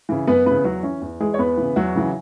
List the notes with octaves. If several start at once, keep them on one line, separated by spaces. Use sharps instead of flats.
C#3 E3
F#2 B3 B4
C#3 E3 B3 B4
E2 F#3 F#4
E3 C#4
E2
E3 G#3 G#4
C#5
E2 B3 B4
C#3 E3
E2 F#3 F#4
C#3 E3